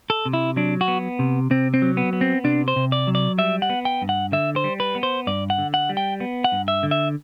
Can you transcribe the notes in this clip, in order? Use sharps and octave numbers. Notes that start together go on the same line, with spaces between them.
A4
C3
E4
F#3 D4
F#4
B3
C3
C3 C4
C4
F#3
B3
B3
C4
C3 D4
C5
C3
D5
F#3
D5
G3 E5
F#5
B3
G5
G2
F#5
D3 E5
C5
G3
B4
B3
C5
G2 D5
F#5
D3
F#5
G3
G5
B3
F#5
G2
E5
D3
E5